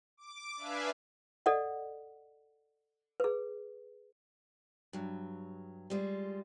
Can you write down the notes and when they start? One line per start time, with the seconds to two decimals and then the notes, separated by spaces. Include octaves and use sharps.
0.17 D6
0.56 D4 B4 E5 F5 G#5
1.46 A4 D5 D#5 F#5
3.20 G#4 B4
4.93 G2 F#3
5.90 G3 G#3 F4